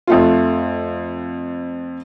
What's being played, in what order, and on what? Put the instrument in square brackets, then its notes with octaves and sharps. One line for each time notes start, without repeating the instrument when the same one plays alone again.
[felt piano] F2 A3 F4